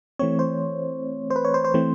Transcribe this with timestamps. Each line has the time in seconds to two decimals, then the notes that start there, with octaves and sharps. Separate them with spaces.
0.19 E3 A3 C4 C#5
0.39 C5
1.31 C5
1.36 B4
1.45 C#5
1.54 C5
1.64 C5
1.74 E3 A3 C4